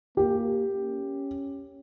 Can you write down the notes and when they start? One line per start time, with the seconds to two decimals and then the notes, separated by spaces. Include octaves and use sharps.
0.17 A#3 G4
0.75 C#4